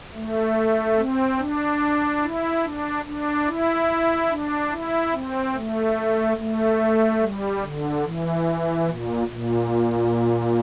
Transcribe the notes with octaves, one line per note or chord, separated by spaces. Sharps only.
A3
C4
D4
E4
D4
D4
E4
D4
E4
C4
A3
A3
G3
D3
E3
A#2
A#2